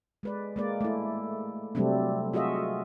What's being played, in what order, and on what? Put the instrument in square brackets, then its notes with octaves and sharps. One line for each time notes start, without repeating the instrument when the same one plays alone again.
[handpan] G#3 B4 D5
G#3 A#3 D5
A3 E4
C3 F#3 G3 A3 C4 D4
F4 F#4 G#4 D#5 E5